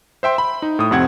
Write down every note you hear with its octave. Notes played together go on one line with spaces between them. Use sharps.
C5 E5 G5 C6
B5
D#4
A2 D#6
F2 C3 C4 F#5 G#6